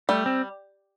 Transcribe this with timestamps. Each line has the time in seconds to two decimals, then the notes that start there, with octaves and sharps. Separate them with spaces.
0.09 G3 A3
0.26 C4